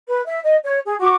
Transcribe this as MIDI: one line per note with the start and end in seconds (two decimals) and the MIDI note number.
0.07 0.21 71
0.25 0.40 76
0.43 0.56 75
0.63 0.79 73
0.85 0.94 68
1.00 1.16 66
1.00 1.16 85
1.00 1.16 86